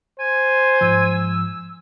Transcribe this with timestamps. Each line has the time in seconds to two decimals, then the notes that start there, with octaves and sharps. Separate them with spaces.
0.20 C5 G#5
0.81 G#2 F3 E6